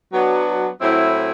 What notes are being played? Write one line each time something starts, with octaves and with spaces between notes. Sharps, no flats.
F#3 B3 D4
A2 F#3 C4 E4